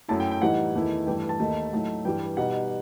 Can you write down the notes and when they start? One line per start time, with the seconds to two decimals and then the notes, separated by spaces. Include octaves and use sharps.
0.09 F#2 F#3 A3 E4 A5
0.20 G5
0.31 G5
0.42 A2 E3 G3 D#4 F#5
0.74 E2 D#3 A3 E4
1.07 G2 E3 A3 E4 G5
1.29 A5
1.40 D#2 D#3 A3 D#4
1.73 A2 F#3 A3 D#4
2.05 G2 E3 G3 G5
2.37 B2 G3 D#4 F#5